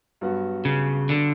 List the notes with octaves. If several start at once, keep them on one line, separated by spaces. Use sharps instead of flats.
G2 F#3 B3 F#4
C#3
D3